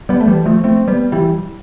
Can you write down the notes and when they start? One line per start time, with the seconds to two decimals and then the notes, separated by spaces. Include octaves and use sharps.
0.09 G3 B3
0.20 A3
0.28 E3 G3
0.46 F3 A3
0.64 A3 C4
0.88 G3 B3
1.12 E3 G3